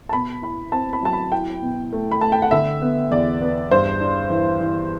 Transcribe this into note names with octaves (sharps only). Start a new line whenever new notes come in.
A5
B2 B5
E4 B5
C4 A5
B5
F#3 A5
B5
E4 G5
B2
A3
B5
A3 A5
G5
F#5
D3 E5
B3
E2 D5
B3
G2 C5
D4
E3
E3